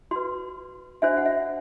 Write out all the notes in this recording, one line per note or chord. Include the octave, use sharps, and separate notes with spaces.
F#4 B4 C6
D4 F#4 C5 E5
F#5
E5